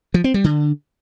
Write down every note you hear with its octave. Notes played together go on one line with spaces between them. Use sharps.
F3
C4
G3
D3